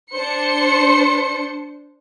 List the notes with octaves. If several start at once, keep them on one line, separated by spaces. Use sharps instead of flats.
D4 C5 C#7